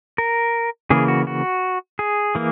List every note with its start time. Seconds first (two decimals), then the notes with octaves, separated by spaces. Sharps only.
0.18 A#4
0.90 C#3 E3 A#3 G#4
1.08 F#4
1.27 F#4
1.99 G#4
2.35 E3 A#3